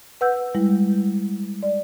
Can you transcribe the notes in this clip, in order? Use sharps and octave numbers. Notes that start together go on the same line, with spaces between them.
B4 F#5 E6 G6
G3 G#3 E4
D5